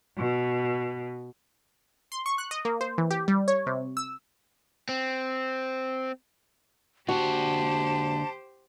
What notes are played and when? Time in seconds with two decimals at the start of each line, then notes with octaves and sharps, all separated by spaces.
0.17 B2
2.12 C6
2.26 C#6
2.38 F#6
2.51 D#5
2.65 A#3
2.81 C5
2.98 E3
3.11 G4
3.28 G3
3.48 C#5
3.67 C3
3.97 E6
4.89 C4
7.09 D3 A#3 F#4 G4 C5 F#5 A5